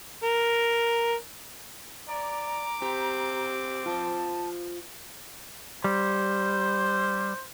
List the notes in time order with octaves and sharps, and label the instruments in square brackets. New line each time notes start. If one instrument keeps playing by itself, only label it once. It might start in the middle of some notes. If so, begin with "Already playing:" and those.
[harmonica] A#4
[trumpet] D5 [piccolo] A#5 [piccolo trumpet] D6
[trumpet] C4 [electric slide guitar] G4
[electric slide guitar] F4 C5 [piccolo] A5
[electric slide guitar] G3 [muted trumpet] C5